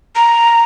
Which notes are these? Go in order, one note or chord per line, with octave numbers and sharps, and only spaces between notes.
A#5